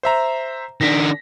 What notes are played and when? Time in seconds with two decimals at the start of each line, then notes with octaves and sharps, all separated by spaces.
0.03 C5 E5 A#5
0.81 D#3 D4 A#6 B6